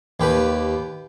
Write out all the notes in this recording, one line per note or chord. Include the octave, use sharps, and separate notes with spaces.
D#2 G4 B4